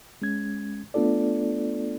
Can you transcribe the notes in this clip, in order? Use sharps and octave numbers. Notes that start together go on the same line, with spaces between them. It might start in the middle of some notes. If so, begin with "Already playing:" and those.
G#3 C#4 G#6
A3 B3 D4 F4 A4 D5